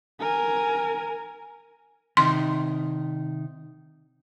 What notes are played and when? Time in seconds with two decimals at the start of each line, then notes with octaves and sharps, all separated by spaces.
0.20 A#4 G#5
2.17 C3 D#3 D#4 C6